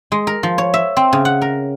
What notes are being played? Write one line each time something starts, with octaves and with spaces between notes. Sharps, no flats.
G#3
A#4
F3
C#5
E5
C4
C#3
F#5
A#4